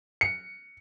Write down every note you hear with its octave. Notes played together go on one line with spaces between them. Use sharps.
C#7